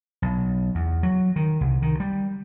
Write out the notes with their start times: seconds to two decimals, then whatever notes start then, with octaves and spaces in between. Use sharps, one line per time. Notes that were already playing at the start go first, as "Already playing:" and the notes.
0.22 B1
0.75 E2
1.03 F#3
1.36 D#3
1.61 C2
1.82 D#3
2.00 G3